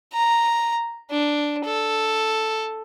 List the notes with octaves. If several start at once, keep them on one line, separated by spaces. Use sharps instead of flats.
A#5
D4
A4